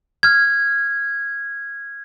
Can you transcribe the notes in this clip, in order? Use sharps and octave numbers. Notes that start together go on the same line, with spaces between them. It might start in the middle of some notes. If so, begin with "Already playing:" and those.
F6 G#6